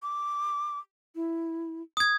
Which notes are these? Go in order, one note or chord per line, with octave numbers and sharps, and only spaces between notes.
D6
E4
D#6 G#6